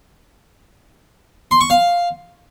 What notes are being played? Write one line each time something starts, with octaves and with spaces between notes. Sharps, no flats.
C6
C#6
F5